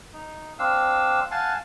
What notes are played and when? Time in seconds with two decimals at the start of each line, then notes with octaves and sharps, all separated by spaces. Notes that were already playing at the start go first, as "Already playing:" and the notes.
0.13 D#4
0.59 C4 D4 F5 E6
1.31 F5 F#5 G#5 A5